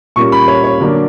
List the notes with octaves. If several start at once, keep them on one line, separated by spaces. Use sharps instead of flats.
A#2 G3 A#3 C#4 C#6
B5
C#5
C#5
D3 F#3 A#3 D4